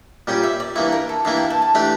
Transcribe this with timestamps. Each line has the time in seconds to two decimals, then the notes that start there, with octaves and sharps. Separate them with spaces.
0.27 A#2 G3 C#4 G4
0.43 E5
0.60 D5
0.76 G2 E3 A#3 E4 C#5
0.92 A#4
1.09 A4
1.25 G2 E3 A#3 E4 F5
1.37 G5
1.50 A5
1.62 A5
1.75 E3 A3 D4 G4